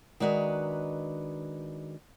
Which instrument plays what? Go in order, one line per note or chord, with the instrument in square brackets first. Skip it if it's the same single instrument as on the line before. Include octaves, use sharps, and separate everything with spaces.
[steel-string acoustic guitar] D#3 G#3 D4 F#4 B4 A#5